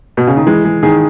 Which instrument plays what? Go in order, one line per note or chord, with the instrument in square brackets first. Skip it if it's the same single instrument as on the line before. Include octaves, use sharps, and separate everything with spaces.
[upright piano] B2
C#3
D#3
[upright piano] E3 [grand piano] G#3
[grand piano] G#3
[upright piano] D#3 [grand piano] G#4